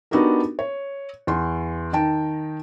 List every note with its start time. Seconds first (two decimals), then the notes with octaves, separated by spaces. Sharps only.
0.11 B3 D4 D#4 F#4 G4 A#4
0.59 C#5
1.27 E2 C6
1.93 D#3 D#4 G5 A5 D7